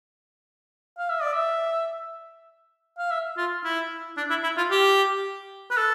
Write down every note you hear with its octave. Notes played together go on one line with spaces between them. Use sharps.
F5
E5
D5
E5
F5
E5
F4
E4
D4
E4
E4
F4
G4
B4
A4